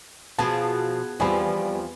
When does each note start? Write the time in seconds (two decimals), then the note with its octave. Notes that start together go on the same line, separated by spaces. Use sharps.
0.39 B2 F3 B3 G#4 A5
1.20 E2 F3 G3 C4 G#5 B5